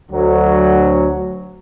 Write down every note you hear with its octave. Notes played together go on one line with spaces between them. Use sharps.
D2 F#3